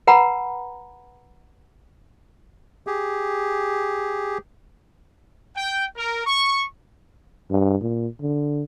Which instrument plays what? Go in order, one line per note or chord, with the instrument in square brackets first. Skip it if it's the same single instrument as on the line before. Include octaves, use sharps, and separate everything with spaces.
[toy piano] B4 F#5 A#5 B5
[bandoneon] G4 G#4
[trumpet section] G5
A#4
C#6
[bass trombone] G2
A#2
D3